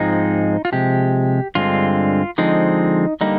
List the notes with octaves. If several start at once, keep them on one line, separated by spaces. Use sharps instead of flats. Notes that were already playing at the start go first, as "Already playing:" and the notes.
Already playing: G#2 F3 G#3 C4 D#4
F4
C3 F3 G#3 G4
G2 D3 G#3 C4 F4
D3 F3 G#3 C4 D#4
D3 G3 A#3 D4 D#4